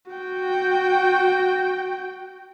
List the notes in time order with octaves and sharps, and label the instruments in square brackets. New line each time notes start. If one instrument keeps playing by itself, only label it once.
[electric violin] F#4 G5